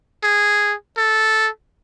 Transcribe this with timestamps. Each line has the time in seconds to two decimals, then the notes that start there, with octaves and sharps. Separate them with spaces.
0.24 G#4
0.97 A4